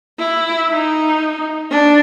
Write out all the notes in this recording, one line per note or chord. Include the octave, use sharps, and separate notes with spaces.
E4
D#4
D4